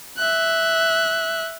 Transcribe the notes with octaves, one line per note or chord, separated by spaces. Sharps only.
E5 F#6